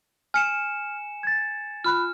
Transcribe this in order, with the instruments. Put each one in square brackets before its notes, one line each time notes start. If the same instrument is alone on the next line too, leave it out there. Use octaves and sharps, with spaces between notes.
[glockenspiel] G#5 C#7 E7 [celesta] F6
[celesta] G#6 A6
[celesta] F4 B5 F#6 [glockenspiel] F6